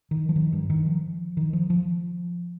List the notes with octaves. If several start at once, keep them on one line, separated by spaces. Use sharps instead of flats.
D#3
F3
D#3
G2
D#3
F3
D#3
F3
F3